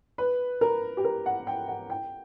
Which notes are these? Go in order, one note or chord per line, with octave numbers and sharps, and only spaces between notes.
B4
A#4
G4
A#4
F#5
G5
F#5
G5